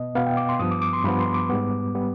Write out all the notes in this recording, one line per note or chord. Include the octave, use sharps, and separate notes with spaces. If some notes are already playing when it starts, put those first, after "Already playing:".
Already playing: B2 B3 D#5
B2 B3 F5
G5
D6
C6
G2 F3 B3 D#6
D6
D6
C6
G2 F3 B3 B5
C6
D6
G#2 G3 B3
G3 B3